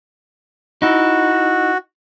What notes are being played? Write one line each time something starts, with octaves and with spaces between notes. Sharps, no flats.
D#4 E4 F#4